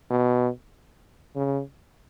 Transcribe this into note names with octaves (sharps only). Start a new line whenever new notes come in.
B2
C#3